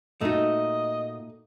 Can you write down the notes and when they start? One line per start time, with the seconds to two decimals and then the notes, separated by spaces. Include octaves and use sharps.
0.21 A#2 A3 D#4 F4 F#4 D#5